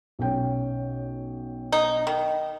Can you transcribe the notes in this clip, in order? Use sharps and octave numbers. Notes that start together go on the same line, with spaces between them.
B1 C#4 G5
D#4
D#3